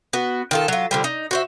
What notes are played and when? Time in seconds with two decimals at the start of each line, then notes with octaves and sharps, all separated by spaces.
0.13 B3 F#4
0.51 D#3 F4 A4
0.68 F#3 F4
0.91 D3 F3 G3
1.04 D#4
1.31 F#4 C5 E5